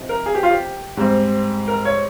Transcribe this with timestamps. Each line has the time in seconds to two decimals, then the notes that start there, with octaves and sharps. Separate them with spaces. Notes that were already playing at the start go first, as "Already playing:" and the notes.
Already playing: C3 F3 C4 D#4
0.09 A#4
0.26 G#4
0.35 G4
0.43 F4
0.51 G4
0.97 G#2 G3 C4
1.68 A#4
1.85 C#5